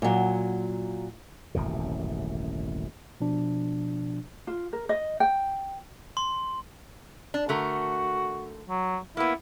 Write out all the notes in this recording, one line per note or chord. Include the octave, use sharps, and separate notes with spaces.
A#2 F#3
D#1 A1 F#2 C3
B2 F3 D4
F4
A#4
D#5
G5
C6
D4
D3 A3 F#4 A#4
F#3
A#3 B3 E4